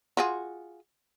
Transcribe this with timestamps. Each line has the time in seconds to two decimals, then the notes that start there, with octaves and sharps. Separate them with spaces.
0.17 F4 F#4 G#4